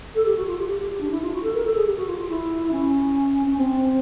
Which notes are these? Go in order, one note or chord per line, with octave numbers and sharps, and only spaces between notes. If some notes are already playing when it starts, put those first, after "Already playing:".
A4
G4
F#4
F4
G4
G4
G4
G4
D4
E4
F4
F#4
A4
A#4
A4
G#4
G4
F#4
F4
F4
E4
C#4
C#4
C4